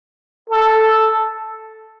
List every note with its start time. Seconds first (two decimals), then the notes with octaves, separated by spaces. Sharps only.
0.50 A4